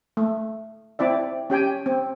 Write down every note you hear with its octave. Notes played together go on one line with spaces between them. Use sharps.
A3
C4 E4 D5 E5
C#4 G4 G5 G#5
C4